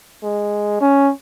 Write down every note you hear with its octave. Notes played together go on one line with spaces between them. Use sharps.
G#3
C#4